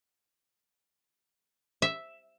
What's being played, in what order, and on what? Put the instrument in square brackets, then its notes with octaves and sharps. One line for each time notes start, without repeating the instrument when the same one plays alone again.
[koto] E5